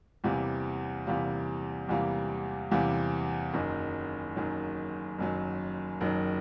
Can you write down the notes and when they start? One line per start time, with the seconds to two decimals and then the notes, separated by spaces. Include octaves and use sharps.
0.24 E2 C3 E3 G3 A#3
1.06 E2 C3 E3 G3 A#3
1.89 E2 C3 E3 G3 A#3
2.71 E2 C3 E3 G3 A#3
3.54 F#1 F#2 D#3 F#3
4.36 F#1 F#2 D#3 F#3
5.18 F#1 F#2 D#3 F#3
6.01 F#1 F#2 D#3 F#3